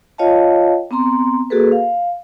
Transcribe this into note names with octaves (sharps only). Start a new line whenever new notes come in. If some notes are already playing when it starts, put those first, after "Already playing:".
F4 C#5 D#5 F5 G5 A5
B3 C4 A#5 C6
A#3 F#4 G#4 A4 B4
F5